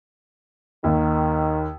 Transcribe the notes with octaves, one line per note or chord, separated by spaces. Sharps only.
D#2 D#3